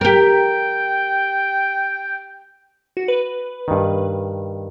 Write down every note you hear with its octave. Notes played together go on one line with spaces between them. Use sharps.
G4 A#4 G5
F#4
B4
G2 D#3